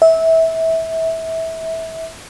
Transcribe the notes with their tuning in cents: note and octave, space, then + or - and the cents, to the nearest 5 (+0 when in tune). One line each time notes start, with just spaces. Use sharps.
E5 -20